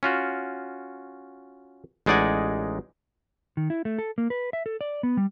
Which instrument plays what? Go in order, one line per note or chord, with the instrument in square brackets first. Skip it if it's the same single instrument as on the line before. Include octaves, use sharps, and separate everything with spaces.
[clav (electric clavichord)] C#4 F4 F#4
A1 G#3 D#4 D5 F#5 G#5
[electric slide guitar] D#3
E4
A3
A4
A#3
B4
E5
A4
D5
B3
G3